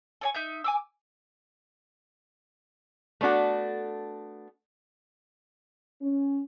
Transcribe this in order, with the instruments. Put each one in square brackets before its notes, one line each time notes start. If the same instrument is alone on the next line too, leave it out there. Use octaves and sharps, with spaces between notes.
[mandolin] A4 C#5 G#5
D#4 E5 G6
G#5 D6 E6
[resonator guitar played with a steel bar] A3 B3 D4 F#4 A4
[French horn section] C#4